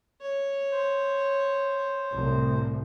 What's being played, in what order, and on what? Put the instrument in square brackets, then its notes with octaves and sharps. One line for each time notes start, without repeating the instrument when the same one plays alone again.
[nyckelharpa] C#5
[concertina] C5
[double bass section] C2 A2